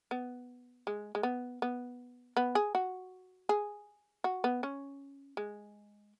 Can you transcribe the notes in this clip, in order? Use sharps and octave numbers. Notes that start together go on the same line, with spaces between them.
B3
G#3
G#3
B3
B3
B3
G#4
F#4
G#4
F#4
B3
C#4
G#3